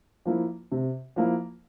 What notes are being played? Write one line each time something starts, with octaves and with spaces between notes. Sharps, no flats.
F3 A#3 E4
C3
F3 A#3 E4